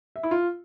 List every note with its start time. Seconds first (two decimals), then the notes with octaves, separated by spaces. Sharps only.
0.16 E5
0.23 E4
0.31 F4